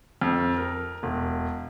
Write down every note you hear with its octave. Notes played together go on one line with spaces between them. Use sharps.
F2
A#4
E1